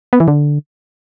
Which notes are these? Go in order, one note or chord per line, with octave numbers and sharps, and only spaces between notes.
B3
E3
D3